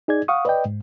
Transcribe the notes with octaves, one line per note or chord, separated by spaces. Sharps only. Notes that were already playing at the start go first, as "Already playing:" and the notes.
D#4 G#4 D5 G#6
F5 F#5 C#6 D#6
B4 D5 D#5 G5
G#2